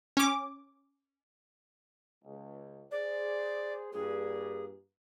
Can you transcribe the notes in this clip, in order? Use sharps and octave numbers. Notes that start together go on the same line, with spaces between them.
C#4 D6
C#2
G#4 C5 D5
G2 A#2 G#4